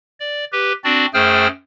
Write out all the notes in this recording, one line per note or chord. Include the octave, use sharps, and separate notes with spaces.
D5
G4 B4
C4 D4 F#4 D5
F#2 A3 G#4 C5 G5 F6